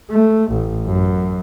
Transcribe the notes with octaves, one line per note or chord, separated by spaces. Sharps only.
A3
A1
F#2